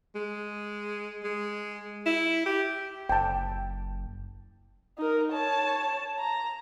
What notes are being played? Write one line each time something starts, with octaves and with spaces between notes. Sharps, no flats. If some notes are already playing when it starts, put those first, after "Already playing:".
G#3
G#3
E4
G4
F#1 G5 A5
D#4 A#4
C#5 A5
A#5